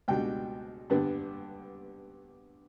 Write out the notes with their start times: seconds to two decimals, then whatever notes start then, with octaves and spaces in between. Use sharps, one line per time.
0.08 C#2 B2 G3 D4 G5
0.90 G2 D3 G3 B3 D4